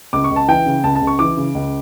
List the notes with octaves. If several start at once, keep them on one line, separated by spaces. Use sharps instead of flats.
C#2 D6
C#6
C#2
A5
E3 G5
C#3
C#2 A5
A5
C#2
C#6
E3 D6
C#3
C#2